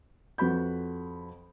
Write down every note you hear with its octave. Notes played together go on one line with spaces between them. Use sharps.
F2 F#4 B4 B5 G6